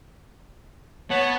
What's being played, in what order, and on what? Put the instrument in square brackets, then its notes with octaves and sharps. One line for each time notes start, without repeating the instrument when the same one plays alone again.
[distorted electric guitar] B3 [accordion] C#5 A5